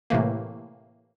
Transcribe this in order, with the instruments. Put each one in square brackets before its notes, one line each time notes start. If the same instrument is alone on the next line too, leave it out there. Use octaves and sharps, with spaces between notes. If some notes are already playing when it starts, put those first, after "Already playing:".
[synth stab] A2 C3 E3 A3 A#3